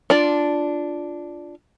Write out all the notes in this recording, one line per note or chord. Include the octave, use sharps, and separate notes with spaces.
D4 F4 D5